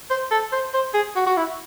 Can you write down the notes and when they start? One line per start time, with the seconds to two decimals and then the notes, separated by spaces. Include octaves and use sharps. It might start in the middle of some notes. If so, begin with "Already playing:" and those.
0.10 C5
0.31 A4
0.52 C5
0.74 C5
0.94 G#4
1.16 F#4
1.26 F#4
1.37 E4